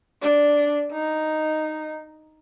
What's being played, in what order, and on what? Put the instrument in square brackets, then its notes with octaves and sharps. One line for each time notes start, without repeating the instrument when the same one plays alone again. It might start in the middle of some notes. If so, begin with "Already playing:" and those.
[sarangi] D4
D#4